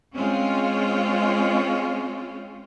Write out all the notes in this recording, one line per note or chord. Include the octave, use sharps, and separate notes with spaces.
G#3 C4 C#4 F4